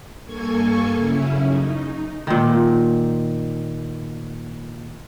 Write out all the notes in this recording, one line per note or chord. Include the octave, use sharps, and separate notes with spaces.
G2 A#3 A4 G#5 C#6 G#6
F#2 C#3 C#4 E4
D#4
A#2 D#3